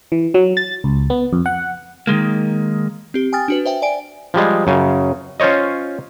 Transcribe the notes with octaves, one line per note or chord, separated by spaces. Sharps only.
E3
F#3
A6
C#2
B3
F2
F#5
D#3 F3 G#3 A#3
C4 G4
G5 G#5 D#6 F6 A6
D4 F#4 B4
C5 E5 G5
D5 G#5 D7
F3 G3 G#3
F#2 C#3
C#4 F4 C5 C#5 D#5